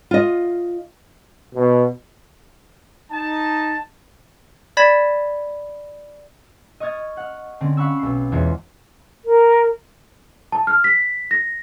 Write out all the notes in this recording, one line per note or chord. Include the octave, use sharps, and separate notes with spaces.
F4 D#5
B2
D#4 A5
D5 B5 G#6 B6 E7
D#5 C#6 D#6 F6 G#6 A6
F#5 F6
D3 C4 C#4
F5 F#5 B5 C#6 E6
B1 C7
E2 E3 G#3 F4 C5 C#5
A#4
A5
F6
B6
A#6